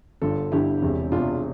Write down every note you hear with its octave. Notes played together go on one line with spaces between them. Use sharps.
G1 G2 D3 F4 A4
G1 G2 D3 E4 G4
E1 E2 C3
E1 E2 C3 D4 F4